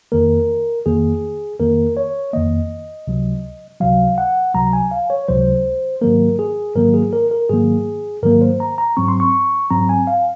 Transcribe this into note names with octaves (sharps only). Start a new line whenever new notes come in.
F2 D#3 A#3 A#4
F2 D#3 A#3 G#4
F2 D#3 A#3 A#4
C#5
F2 D#3 A#3 D#5
C#2 C3 F#3
C#2 C3 F#3 F5
F#5
C#2 C3 F#3 A#5
G#5
F5
C#5
C#2 C3 F#3 C5
G#2 D#3 F#3 A#3 A#4
G#4
G#2 D#3 F#3 A#3 A#4
G#4
A#4
A#4
G#2 D#3 F#3 A#3 G#4
G#2 D#3 F#3 A#3 A#4
C5
A#5
A#5
G#2 F#3 C4 C#6
C6
C#6
G#2 F#3 C4 A#5
G#5
F5